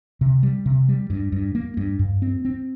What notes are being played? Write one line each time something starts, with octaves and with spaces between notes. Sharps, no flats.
C3
G3
C3
G3
G2
G2
A#3
G2
G2
C4
C4